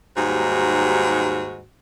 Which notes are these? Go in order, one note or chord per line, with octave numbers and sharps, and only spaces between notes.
D#2 G#2 G3 F#4